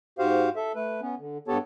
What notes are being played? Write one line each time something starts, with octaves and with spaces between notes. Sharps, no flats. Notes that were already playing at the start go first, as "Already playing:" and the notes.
G#2 F#4 G4 C5 F5
A4 E5
A3 B4
B3 C#4
D3
G2 B3 G4 A4 C#5 A5